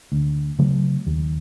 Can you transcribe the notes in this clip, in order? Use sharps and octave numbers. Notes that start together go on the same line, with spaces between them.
D2
C#3 F#3 A3
D#2